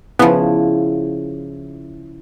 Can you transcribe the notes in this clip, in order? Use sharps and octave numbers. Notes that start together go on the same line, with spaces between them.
C#3 F3 B3 E4